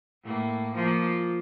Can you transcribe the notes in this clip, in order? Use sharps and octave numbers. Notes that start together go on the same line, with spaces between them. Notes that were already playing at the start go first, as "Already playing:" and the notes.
A2 A#3
F3 A#3 F4